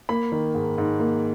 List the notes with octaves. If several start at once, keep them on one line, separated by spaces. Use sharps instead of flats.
A#3 B5
D#3
G#2
G#2
A#3